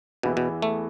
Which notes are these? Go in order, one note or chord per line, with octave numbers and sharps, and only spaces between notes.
E2 B2 E3 B3 E4
B2
A3